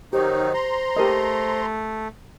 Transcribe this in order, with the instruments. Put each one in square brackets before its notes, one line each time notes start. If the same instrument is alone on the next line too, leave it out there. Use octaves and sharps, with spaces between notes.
[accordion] D#3 F#3 D#4 [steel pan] G4 [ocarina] C5
[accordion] A#5 C6
[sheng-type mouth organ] A3 [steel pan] G4 A#4 D#5